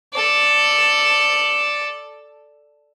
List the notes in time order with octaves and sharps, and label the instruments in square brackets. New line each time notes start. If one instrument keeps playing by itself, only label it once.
[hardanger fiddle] A4 D5